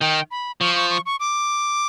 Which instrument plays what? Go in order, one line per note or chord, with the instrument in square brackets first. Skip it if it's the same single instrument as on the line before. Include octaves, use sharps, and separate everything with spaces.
[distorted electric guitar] D#3 [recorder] G5
[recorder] B5
[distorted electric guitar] F3 [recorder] C#6
[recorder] C#6
C#6
C#6
D6